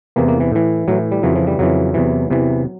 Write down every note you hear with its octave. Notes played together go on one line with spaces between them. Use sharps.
E2 C3 E3 A#3
A#3
E3
A2 E3
A2 E3 F#3
G3
F2 C#3 E3 F#3
F3
G3
F2 C#3 E3 F#3
E2 C3 E3
E2 C3 E3